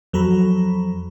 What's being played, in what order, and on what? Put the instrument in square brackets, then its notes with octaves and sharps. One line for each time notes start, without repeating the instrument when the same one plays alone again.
[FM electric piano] F2 F#3 A4 A#5 B5